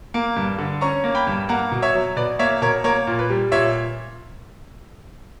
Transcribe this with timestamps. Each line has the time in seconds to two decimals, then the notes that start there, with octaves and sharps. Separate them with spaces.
0.14 A#3
0.37 G2
0.58 D3
0.81 C#4 A#5 C#6
1.04 A#3
1.15 G5 B5
1.27 G2
1.49 A#3 F#5 A#5
1.72 B2
1.82 C#5 E5
1.94 F#3
2.16 B2 B4 D5
2.39 A#3 C#5 E5
2.62 B2 A#4 C#5
2.84 A#3 A#4 C#5
3.07 A#2
3.19 B4
3.30 G3
3.52 A#2 C#5 E5